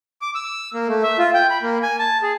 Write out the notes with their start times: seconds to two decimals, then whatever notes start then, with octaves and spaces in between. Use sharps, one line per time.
0.21 D6
0.35 E6
0.74 A#3
0.88 A3
1.03 E5
1.18 F4
1.34 G5
1.50 B5
1.63 A#3
1.83 G#5
1.99 A5
2.22 G#4